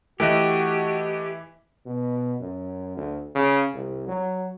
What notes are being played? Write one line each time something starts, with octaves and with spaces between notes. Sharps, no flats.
E3 A3 E4 F#4 G4 D#5 F#6
B2
F#2
D2
C#3
C2
F#3